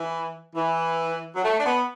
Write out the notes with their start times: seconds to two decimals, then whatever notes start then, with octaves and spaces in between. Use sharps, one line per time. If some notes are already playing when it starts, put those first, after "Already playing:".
Already playing: E3
0.55 E3
1.36 F#3
1.43 A3
1.59 D4
1.66 B3